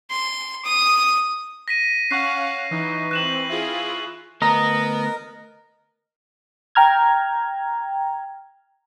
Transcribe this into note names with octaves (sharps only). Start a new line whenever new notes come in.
C6
D#6
A#6 B6 D#7
C#4 F5 F#5 C#6 F#6 C7
E3 D#4
E3 C4 F#6 E7 F#7
E4 F4 G#4
D2 B3 A#4 D#5 A#5
G5 A#5 F6 G#6